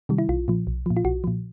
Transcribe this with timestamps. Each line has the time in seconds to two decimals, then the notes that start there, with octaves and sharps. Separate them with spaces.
0.09 C3 D#3 G3
0.18 E4
0.29 B1 F4
0.48 A#2 F3
0.67 B1
0.86 A#2 F3
0.97 F4
1.05 B1 F#4
1.24 A#2 F3